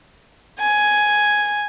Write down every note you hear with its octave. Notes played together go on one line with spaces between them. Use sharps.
G#5